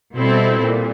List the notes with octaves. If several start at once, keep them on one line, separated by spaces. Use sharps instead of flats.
B2 G3 C4 E4 A4
A#2 G3